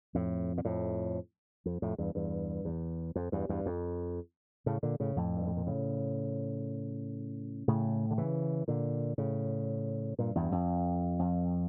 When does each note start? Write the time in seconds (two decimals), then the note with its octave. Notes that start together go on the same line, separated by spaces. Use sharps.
0.15 F2 A2
0.58 A#2
0.65 F2 A2
1.66 F2
1.82 F2 A2
1.98 E2 G2
2.15 E2 G2
2.65 E2
3.16 F2
3.32 E2 G2
3.49 E2 G2
3.66 F2
4.66 A2 C#3
4.83 A#2 D3
5.00 A2 C#3
5.16 F2 A2
5.37 G2
5.47 A2
5.57 A#2
5.67 A2 C#3
7.68 A2 C#3
8.11 D3
8.18 C#3 E3
8.68 A#2 D3
9.18 A2 C#3
10.19 G2 A#2
10.35 E2 G2
10.52 F2
11.19 F2